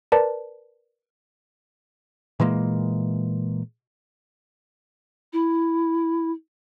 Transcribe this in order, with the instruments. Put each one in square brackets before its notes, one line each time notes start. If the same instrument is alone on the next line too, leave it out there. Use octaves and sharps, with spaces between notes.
[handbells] A#4 B4 D5 A5
[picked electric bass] A#2 E3 G#3 A#3
[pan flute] E4